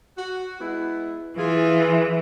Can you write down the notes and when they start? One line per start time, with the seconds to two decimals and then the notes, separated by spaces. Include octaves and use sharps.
0.18 F#4
0.61 G#3 B3 E4
1.39 E3 F4 G#4